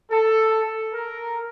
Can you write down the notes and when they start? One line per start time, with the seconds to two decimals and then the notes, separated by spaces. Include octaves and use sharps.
0.10 A4
0.93 A#4